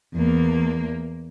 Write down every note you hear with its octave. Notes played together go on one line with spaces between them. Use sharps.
E2 A#3